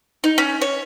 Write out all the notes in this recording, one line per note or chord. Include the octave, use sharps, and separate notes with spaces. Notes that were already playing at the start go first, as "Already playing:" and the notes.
D#4
C#4
C#5